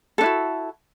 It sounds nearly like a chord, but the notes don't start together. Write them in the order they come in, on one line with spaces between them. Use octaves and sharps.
A4 D4 E4 F#4